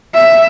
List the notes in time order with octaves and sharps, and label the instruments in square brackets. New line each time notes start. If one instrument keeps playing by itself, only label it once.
[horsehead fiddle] E5